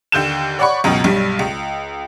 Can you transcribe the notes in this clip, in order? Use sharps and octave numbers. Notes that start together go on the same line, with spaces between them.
D#2 D3 G6 E7
C#5 D5 F#5 B5 C#6
C#2 F#2 B2
B1 G2 G3
C#2